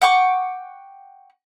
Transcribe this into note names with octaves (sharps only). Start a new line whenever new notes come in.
F#5 G5 C#6 D6